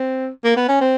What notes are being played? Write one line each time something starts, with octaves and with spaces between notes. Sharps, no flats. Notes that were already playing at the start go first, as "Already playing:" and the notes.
Already playing: C4
A#3
B3
C#4
C4